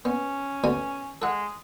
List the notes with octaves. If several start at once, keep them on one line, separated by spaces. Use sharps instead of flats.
B3 C#4
D2 B3 G#5
G#3 A4 F#5